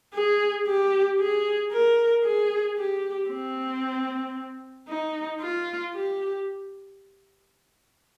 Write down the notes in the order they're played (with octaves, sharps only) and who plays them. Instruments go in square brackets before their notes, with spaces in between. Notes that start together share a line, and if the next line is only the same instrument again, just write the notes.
[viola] G#4
G4
G#4
A#4
G#4
G4
C4
D#4
F4
G4